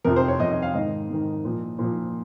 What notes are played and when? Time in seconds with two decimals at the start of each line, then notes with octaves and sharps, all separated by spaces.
0.05 F2 C3 F3 A#4
0.16 C5
0.28 C#5
0.40 F2 C3 F3 D#5
0.51 D#5
0.62 F5
0.74 G#2 D#3 D#5
1.09 G#2 D#3
1.45 A#2 F3
1.79 A#2 F3